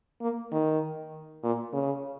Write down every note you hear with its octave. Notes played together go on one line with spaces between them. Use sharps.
A#3
D#3
A#2
C#3